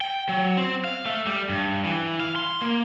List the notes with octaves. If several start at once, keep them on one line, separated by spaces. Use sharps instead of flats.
G5
F#3
C4
F5
A3
G3
G2
E3
F5
C6
A#3